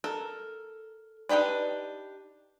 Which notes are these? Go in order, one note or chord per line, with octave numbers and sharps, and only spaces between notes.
A4 A#4
D4 D#4 G4 B4 D5